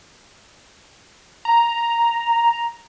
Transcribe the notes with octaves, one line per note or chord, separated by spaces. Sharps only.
A#5